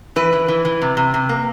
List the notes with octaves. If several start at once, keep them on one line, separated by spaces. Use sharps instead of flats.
E3 B4
E3
E3
E3
C3
C3
C3
A#3